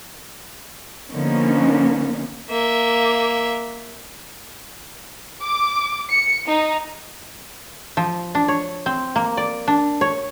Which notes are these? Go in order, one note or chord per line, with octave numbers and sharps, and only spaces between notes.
D3 F3 A#3 B3 C#4 D#4
A#3 E5
D6
C#7
D#4
F3
D4
C#5
C4
A#3
D5
D4
C#5